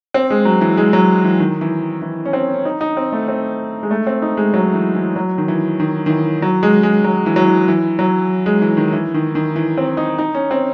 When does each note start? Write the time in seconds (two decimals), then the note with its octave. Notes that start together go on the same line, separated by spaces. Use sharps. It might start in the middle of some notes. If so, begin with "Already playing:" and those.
0.14 C4
0.30 G#3
0.45 F#3
0.61 E3
0.77 G#3
0.93 F#3
1.25 E3
1.40 D#3
1.61 E3
2.02 E3
2.25 C#4
2.33 C4
2.54 C#4
2.65 D#4
2.81 D#4
2.97 C4
3.12 A3
3.28 C4
3.83 G#3
3.91 A3
4.07 C4
4.22 D#4
4.37 G#3
4.54 F#3
4.74 E3
4.95 E3
5.16 F#3
5.38 D#3
5.48 E3
5.80 D#3
6.06 D#3
6.10 E3
6.42 F#3
6.63 G#3
6.83 G#3
7.04 F#3
7.26 E3
7.36 F#3
7.47 E3
7.68 E3
7.99 F#3
8.46 G#3
8.62 E3
8.77 D#3
8.93 E3
9.14 D#3
9.35 D#3
9.56 E3
9.77 C4
9.97 D#4
10.18 D#4
10.35 C#4
10.51 C4